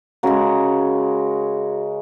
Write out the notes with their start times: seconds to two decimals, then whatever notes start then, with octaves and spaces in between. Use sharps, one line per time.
0.23 C#3 G#3 F#4 A#4